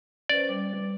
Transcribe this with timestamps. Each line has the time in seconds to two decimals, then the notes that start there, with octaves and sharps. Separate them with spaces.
0.29 C#4 B4 C5 D5
0.49 G3 D6